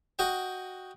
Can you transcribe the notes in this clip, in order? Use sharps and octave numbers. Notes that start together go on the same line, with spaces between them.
F#4 D#5 G5